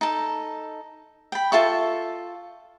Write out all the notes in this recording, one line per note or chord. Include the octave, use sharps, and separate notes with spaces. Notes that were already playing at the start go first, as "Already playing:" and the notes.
D#4 A4
G5 B5
F4 A4 E5 C#6